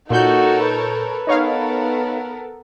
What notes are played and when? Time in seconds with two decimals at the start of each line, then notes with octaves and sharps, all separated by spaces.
0.10 A#2 D#4 F#4 A4 A#4 C#5 G6
0.66 B4
1.27 B3 D#4 A4 A#4 C#5 F5